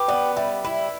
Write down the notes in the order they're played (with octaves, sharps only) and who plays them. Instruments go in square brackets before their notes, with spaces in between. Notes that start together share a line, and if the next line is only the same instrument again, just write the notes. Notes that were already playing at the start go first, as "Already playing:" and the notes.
Already playing: [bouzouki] G4 [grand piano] B4
[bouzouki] B3 [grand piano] D5
[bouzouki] G3 [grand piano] E5
[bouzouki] E4 [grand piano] E5